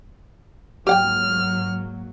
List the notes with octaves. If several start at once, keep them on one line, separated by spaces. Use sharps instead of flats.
G#2 F#3 A#3 G4 F#5 G5 F6